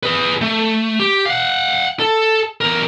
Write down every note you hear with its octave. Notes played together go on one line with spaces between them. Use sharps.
G#4 B4
A3
G4
F5 F#5
A4
E2 A#4